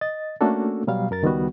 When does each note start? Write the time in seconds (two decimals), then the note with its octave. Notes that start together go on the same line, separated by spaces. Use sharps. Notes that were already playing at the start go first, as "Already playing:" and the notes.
0.01 D#5 A6
0.41 A3 A#3 C#4 D4 F#4 A4
0.87 B2 F#3 G3 F5
1.11 F#2 A#4 A6
1.23 C#2 D#3 G3 B3 F#4